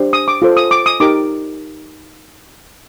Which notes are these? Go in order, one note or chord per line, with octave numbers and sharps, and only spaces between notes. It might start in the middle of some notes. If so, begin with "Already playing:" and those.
Already playing: D4 G4 C5
D#6
D6
F4 A4 C5
D#6
D6
D#6
D#4 G4 A#4 D6